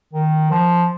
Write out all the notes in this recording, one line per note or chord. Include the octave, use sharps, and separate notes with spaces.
D#3
F3